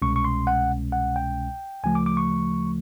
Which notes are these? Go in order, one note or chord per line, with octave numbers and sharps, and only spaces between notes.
C2 B2 G#3 C#4 C#6
C#6
C6
F#5
F#5
G5
D2 C#3 F3 A3 G#5
D6
D6
C#6